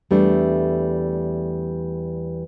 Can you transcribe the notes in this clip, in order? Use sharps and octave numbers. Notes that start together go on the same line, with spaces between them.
E2 G3 A3 D4